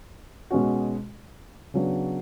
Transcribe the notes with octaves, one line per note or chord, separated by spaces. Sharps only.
B2 G#3 C#4 F#4
C#3 F#3 B3 D4